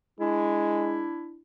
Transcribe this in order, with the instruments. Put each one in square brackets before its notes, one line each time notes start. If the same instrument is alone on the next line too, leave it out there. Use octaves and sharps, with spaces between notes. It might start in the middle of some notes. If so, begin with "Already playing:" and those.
[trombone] G#3 [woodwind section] D4 E4